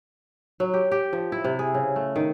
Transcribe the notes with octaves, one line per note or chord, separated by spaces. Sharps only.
F#3
G4
G4
F3
E4
C3
G#4
C#3
A3
D#3